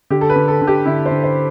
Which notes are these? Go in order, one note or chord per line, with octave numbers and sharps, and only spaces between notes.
D3 G4
A4
B4
D3
A4
D3
G4
D3 E4
C5
D3
C5